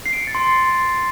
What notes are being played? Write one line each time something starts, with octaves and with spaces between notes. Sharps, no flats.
C7
D7
C#7
A6
C6